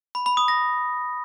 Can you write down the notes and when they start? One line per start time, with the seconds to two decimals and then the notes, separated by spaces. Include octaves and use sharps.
0.15 B5
0.26 B5
0.37 D#6
0.48 A#6